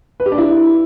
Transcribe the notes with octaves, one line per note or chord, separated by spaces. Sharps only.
B4
G4
D4
E4